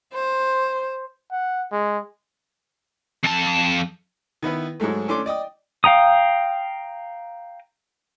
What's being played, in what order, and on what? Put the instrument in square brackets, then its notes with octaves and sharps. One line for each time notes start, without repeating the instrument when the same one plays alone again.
[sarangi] C5
[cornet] F#5
G#3
[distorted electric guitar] F2 A5
[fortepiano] D#3 B3 E4 B4
G#2 F#3 G#3 A3
A3 C#4 D4 C6 D6
D5 D#5 G5 D#6
[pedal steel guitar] F5 G5 A#5 D#6